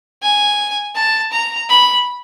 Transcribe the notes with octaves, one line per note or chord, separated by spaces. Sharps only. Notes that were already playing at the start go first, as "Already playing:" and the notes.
G#5
A5
A#5
B5